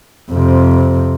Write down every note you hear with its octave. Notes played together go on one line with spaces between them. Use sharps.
F2 C3